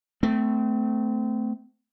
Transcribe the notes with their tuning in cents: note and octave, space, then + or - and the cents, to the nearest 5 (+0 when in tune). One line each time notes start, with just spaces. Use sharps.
A3 +0 C4 -30